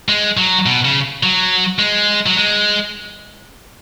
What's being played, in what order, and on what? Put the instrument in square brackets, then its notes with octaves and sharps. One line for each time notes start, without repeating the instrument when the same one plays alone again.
[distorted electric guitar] G#3
F#3
B2
C#3
F#3
G#3
F#3
G#3